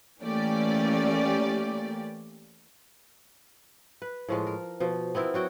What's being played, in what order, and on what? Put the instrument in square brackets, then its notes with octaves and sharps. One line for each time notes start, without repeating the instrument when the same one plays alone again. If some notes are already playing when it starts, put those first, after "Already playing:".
[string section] E3 A3 A#3 C#4 G4 D5
[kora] B4
A2 F3 G#3
A#4
B2 F3
B3 C4 E4 A#4
F#3 F#4 G5